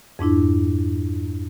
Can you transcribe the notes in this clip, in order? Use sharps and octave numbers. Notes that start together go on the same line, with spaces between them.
F2 G#2 D4 E4